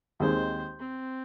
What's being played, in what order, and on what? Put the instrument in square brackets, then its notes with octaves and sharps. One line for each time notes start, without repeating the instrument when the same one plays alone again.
[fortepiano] D#2 D#3 G#3 C4 [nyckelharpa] C5
[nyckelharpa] C4